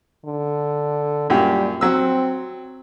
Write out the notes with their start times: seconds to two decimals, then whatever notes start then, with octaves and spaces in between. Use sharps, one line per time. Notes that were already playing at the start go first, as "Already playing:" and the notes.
0.25 D3
1.30 F#2 A#2 G3 G4
1.81 F#3 C4 E6